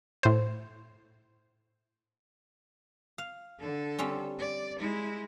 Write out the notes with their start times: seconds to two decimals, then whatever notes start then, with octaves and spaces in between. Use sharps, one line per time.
0.23 A2 C5
3.18 F5
3.59 D3 A4
3.99 G3 C4 C#4
4.38 D5
4.79 G#3 E4